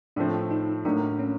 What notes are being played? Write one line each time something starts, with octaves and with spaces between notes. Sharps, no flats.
A2 F3 A3 C4 D4
D#4
A2 F#3 A#3 D4
C#4